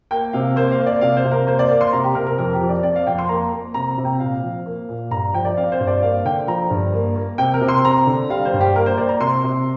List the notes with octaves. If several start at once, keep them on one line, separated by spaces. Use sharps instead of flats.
A#3 G5
C3 F5
A#3 C5
F5
A#3
D5
C3 F5
C5
C3
A#4
A#3 C5
D5
A#3 F5
C6
C3 A#5
G4
C3 A#4
A#4
F2 A#4
G4
F3
D5
C4 D5
F5
F2 G5
C6
A#3 A#5
A#3
C3 A#5
A#5
C3
G5
A#2 F5
F3
A#3
A#2
G2 A#5
F3 G5
D5
C4 F5
C5
G2
D5
A#3 F5
D3 G5
F3 A#5
G2
A#3
A#3
C3 G5
A#4
C3
C6
C4 A#5
D3
G3 F5
C5
G2
G4
A#3 A#4
C5
A#3 D5
A#5
C3 C6
C3